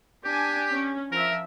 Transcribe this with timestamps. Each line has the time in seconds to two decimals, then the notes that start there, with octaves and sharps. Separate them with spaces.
0.25 D4 G4 G#5
0.70 C#4
1.12 F3 A#4 E5